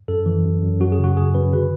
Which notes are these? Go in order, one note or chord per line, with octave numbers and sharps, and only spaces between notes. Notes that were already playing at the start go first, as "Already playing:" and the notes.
F#2 A4
E3
F#2
F#2
F#2 F#4
G#4
C#3
F#4
C#3 G#4
F#2 B4
D3 B4